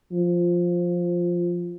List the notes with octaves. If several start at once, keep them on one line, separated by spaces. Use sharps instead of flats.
F3